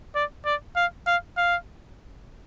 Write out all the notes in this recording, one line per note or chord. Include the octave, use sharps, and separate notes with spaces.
D5
D5
F5
F5
F5